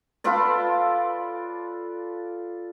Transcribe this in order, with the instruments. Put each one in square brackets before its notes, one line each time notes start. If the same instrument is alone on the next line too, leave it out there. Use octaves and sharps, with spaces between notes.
[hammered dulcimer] F4 A4 B4 D5